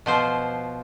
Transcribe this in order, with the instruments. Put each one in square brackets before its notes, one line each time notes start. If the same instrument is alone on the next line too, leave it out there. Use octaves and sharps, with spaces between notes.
[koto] B2 F3 C5